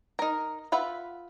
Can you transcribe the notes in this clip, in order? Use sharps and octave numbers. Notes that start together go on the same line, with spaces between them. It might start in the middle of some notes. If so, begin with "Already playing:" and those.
D#4 A#4
F4 B4 E5 F#5